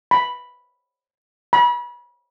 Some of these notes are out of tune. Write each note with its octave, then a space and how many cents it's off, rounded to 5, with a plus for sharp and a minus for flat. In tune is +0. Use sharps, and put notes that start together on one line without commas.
B5 +0
B5 -35